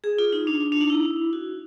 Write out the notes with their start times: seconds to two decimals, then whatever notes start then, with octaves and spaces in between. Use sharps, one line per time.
0.04 G#4
0.18 F4
0.33 D#4
0.47 D4
0.72 D4
0.81 D#4
0.90 E4
1.33 F#4